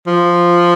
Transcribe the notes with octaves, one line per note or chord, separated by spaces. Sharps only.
F3